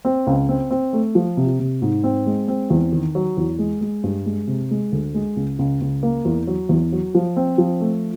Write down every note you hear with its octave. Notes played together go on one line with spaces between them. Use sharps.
C4
C#2
C4
C4
A3
F3
C3
C3
G#2
C4
G#3
C4
E2
D#3
F#3
E2
G#3
G#3
G2
G#3
C3
G#3
D2
G#3
C#2
C#2
C#2
A#3
E2
F#3
E2
F#3
F3
C4
F3
A3